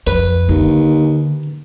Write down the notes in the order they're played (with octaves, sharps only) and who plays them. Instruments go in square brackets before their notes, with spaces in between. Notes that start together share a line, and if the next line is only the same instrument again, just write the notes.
[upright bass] F2 [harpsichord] B4
[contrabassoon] D#2 [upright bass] D3